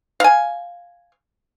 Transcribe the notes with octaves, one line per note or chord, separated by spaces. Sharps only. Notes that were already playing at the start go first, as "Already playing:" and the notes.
F5 G#5